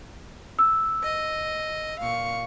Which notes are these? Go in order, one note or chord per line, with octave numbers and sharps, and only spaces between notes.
E6
D#5
A#2 F5 C#6